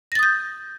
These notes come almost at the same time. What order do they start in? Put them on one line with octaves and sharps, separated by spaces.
A#6 A6 D#6 G6